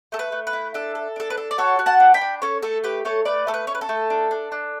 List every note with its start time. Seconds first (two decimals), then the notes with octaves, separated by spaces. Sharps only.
0.12 A3 A4
0.19 B4
0.32 A3
0.47 B4
0.53 E4
0.74 D4 A4
0.95 A4
1.16 D4 A4
1.30 B4
1.37 A4
1.51 D5
1.58 F#4 A4 C#5
1.79 F#4
1.86 F#5 A5
2.00 D4
2.14 G5 B5
2.21 D4
2.42 C#4 A4 C#5
2.62 A3 A4
2.84 G4 B4
3.05 A3 A4 C#5
3.25 A3 B4 D5
3.47 A3 A4
3.54 B4
3.67 C#4 C#5
3.75 B4
3.81 A4
3.89 A3
4.10 D4
4.31 D4
4.52 D4